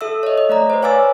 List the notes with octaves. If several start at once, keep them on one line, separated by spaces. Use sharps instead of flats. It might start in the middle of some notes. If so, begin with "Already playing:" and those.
A4 E5 E6
C#5 D#5
D#5
A3 D5 A#5
B4 C5
C#5 F5 G#5 D6 E6 A6